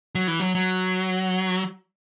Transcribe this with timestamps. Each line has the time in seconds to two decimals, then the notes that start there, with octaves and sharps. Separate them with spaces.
0.15 F#3
0.28 E3
0.40 F#3
0.55 F#3